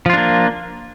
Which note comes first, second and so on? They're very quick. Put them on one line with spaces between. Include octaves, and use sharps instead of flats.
F3 F4 D4 A#3